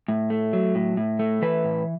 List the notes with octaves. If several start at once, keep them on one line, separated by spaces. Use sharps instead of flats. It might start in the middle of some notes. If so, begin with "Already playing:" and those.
A2
A3
F#3
A2
A2
A3
E3 B4
A2